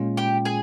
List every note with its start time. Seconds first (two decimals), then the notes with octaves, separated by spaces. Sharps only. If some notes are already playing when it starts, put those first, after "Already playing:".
Already playing: A#2 G#3 C#4 F4
0.17 G4 G5
0.45 G#4 G#5